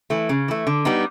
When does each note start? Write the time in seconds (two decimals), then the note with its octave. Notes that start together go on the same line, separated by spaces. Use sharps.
0.10 E3 A3
0.29 C#3
0.48 E3 A3
0.67 D3
0.85 G3 B3 D#4